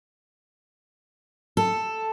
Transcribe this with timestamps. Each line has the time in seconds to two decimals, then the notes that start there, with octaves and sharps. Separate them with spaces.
1.57 A4